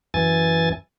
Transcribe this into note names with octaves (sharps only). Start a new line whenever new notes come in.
F#2 E3 G#5 A6